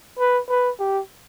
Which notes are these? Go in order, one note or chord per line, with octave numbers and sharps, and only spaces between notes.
B4
B4
G4